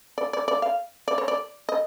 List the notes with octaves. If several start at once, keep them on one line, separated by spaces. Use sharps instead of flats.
D5
D5
D5
F5
D5
C#5
D5
D#5